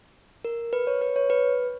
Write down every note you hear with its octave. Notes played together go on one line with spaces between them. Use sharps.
A#4
B4
C#5
B4
C#5
B4